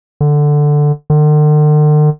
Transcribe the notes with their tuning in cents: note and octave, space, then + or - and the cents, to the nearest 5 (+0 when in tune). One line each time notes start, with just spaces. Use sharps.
D3 +5
D3 +45